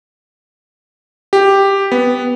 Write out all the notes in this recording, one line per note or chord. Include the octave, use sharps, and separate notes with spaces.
G4
B3